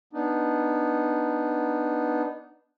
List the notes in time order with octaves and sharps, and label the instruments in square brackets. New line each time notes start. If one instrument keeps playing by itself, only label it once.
[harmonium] B3 D4 D#4